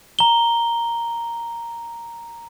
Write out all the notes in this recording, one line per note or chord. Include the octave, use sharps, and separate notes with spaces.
A#5 G7